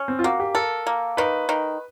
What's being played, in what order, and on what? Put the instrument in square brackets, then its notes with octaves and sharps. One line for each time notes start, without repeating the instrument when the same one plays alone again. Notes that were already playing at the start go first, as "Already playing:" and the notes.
Already playing: [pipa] C#4
[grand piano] C4
F4
[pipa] A#3 [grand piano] F#4
[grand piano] G4
[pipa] A4 [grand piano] A#4
[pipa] A#3
[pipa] D#3 [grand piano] B4
[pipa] D#3